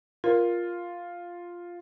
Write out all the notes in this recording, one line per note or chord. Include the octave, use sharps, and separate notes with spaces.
F4 A#4 C5